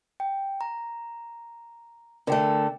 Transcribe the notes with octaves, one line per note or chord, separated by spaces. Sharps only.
G5
A#5
D3 A3 A#4 G5